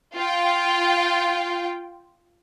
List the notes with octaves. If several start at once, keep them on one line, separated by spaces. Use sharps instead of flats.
F4 G5